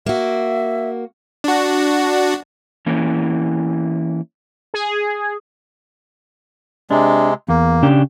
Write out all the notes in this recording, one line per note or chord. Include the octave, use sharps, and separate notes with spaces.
A#3 F#4 E5
D4 F#4
E3 A#3 C#4 E4
G#4
C3 G#3 D4
E2 A#3
C#3 D4 G4